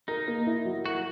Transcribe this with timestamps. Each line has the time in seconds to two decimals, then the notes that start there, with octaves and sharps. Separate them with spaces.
0.08 D#4 A#4
0.28 A#3
0.47 E4
0.65 F#3
0.85 F#4 A#4